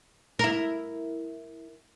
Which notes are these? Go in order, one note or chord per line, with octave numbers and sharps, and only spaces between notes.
E4 A#4